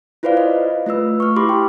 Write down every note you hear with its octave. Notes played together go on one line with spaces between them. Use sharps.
E4 F4 B4 C5 D5 F5
D#5
A3 F4 B4 E6
C#6 F6
E4 G4 B5 C6 D6
G5